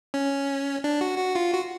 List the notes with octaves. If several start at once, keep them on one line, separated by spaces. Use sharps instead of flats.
C#4
D4
F#4
F#4
F4
F#4